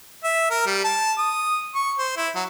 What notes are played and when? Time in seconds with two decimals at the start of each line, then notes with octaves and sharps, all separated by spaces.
0.24 E5
0.50 A#4
0.66 G3
0.84 A5
1.18 D#6
1.75 C#6
1.99 C5
2.17 E4
2.35 F#3